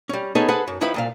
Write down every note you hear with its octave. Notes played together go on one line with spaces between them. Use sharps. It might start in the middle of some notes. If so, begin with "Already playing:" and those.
G3 C#4
B3 C#4 D#4 G#4 A4 B4
G#4 A4 B4 C5 F#5
F#2
D#3 F3 E4 B4 E5 B5
C2 A#2 F5